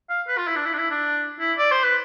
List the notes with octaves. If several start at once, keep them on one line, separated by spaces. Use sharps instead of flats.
F5
B4
F4
E4
D4
E4
D4
E4
D4
E4
D5
C5
B4